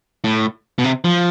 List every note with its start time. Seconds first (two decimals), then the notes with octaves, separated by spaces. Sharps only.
0.24 A2
0.78 B2
0.84 C3
1.04 F3